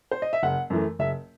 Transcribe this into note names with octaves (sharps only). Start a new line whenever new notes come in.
C5
D#5
E5
F#1 F#5
F#2 E3 A3
F#1 E5